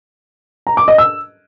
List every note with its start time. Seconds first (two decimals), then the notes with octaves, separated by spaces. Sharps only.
0.67 A#5
0.77 D6
0.88 D#5
0.98 E6